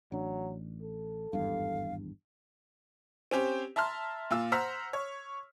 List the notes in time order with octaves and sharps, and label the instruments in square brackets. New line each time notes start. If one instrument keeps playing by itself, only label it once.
[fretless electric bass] A1 D4 [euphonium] F#3
[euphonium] A4
[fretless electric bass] G#1 E2 G2 [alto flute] F5
[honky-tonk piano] C4 C#4 G4 C5
E5 A5 A#5 C6 F6
A#2 F4 E6
C5 F#5 A#5 E6 F6 B6
C#5